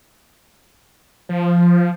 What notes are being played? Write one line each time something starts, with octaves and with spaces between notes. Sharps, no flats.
F3